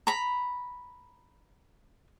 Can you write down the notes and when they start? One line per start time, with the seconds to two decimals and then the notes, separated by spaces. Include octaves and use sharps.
0.07 A#5 B5